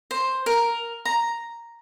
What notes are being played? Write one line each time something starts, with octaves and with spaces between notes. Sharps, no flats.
C5
A#4
A#5